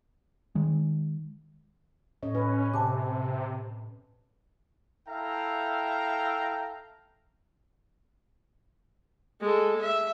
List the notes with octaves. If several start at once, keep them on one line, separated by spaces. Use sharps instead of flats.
D#3 G#3
A2 C#4 C#5 D#5
C#4 B4
C3 G#5 A5 D6
E4 A4 E5 F5 G5 A#5
G#3 A4
E5